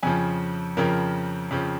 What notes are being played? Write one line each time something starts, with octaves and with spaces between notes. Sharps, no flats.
F2 C#3 F3 G#5
F2 C#3 F3 A#4
F2 C#3 F3